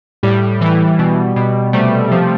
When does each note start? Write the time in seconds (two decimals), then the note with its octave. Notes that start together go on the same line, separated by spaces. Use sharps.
0.23 A2 G3
0.61 E3
0.99 B2
1.36 B2
1.73 C3 G3 A3
2.11 F3